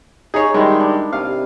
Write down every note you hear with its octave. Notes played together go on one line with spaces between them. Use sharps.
D#4 G#4 C#5
D#3 G3 G#3 E4
D4
C3 F5